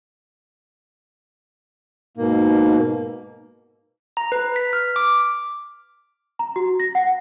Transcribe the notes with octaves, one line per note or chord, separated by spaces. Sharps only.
G#2 B2 A#3
A#5
B4
B6
F6
D6
A#5
F#4
A#6
F#5